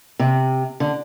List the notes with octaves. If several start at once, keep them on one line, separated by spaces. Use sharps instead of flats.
C3
D3